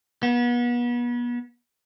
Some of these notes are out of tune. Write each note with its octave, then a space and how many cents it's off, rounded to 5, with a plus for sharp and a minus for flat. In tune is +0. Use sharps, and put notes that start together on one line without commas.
B3 -35